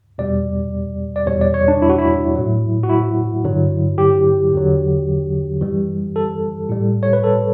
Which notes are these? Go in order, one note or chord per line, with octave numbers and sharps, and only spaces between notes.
E2 B2 G3 D5
D5
E2 B2 G3 C#5
D5
C#5
D4
E4
F#4
E4
A2 F#3
F#4
E4
G2 D3 F#3
G4
E2 D3 F#3
F#2 E3 G3
A4
A2 G3
C#5
B4
A4